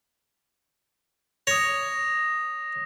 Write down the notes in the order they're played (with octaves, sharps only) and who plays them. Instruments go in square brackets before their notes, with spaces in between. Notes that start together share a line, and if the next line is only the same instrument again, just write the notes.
[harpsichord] C#5 [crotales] D#6 A#6